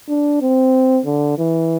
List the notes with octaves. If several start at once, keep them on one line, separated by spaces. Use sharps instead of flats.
D4
C4
D3
E3